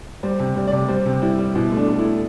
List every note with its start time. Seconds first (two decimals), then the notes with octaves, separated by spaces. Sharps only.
0.23 G3 C5
0.39 C3
0.56 G3
0.67 C3 D5
0.88 G3 C5
1.06 C3
1.22 G3 E4
1.38 G3
1.55 B2 E4
1.72 A3
1.77 D4
1.88 A3
1.99 E4
2.04 A3